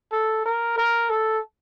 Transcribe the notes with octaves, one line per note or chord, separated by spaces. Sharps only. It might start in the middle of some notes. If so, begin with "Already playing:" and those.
A4
A#4
A#4
A4